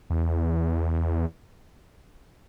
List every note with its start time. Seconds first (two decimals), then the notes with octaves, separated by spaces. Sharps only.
0.10 E2